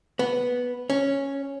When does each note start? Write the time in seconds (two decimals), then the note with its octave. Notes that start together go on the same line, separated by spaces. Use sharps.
0.19 B3
0.90 C#4